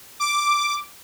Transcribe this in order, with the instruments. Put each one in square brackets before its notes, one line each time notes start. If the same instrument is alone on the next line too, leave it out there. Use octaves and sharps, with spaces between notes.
[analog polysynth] D6